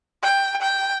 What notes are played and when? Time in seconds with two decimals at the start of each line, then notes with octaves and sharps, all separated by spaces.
0.22 G5
0.61 G5